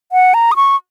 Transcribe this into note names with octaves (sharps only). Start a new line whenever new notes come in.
F#5
A#5
D#6
C#6